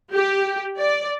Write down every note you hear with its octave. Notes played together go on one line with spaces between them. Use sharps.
G4
D5